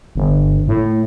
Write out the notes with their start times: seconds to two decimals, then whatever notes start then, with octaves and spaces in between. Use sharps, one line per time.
0.16 G1
0.68 A2